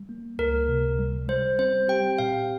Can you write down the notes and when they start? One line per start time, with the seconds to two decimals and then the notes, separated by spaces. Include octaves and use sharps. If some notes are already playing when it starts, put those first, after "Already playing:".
Already playing: G3
0.09 A#3
0.39 C#2 A#4
0.68 C3
0.99 G3
1.29 G3 C5
1.59 C4 C5
1.88 G4 G5
2.18 A#2 F5